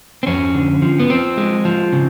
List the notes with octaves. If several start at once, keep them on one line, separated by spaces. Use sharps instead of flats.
C4
F2 C#4
D3
F3
B3
F3 C4
G#3
F3
C#3